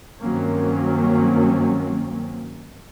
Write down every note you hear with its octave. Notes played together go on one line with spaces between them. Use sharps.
G2 D#3 F#3 A#3 C4 C#4